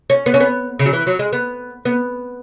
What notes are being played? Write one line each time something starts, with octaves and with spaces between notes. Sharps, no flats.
C#4
B3
C#4
B3
C#3
F#3
E3
F#3
G#3
B3
B3